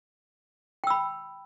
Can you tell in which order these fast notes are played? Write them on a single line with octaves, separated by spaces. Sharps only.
G5 E6 B5